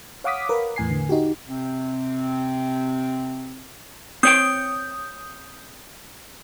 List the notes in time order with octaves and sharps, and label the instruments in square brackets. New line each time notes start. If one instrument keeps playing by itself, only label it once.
[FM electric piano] C#5 F5 F#5 D6 D#6 B6
A#4 B4
E2 A2 G#5 C7
D3
D#4 F#4 G4
[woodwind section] C3 C4
[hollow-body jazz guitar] C4 C#5 G5 [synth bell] D#6 G6